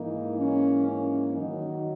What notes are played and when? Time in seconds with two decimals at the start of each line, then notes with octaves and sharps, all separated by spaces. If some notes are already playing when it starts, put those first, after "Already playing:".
Already playing: G#2 E3 A#3 D#4
0.39 C#4
0.87 C#4
1.34 F#2 D#3 F#3 D#4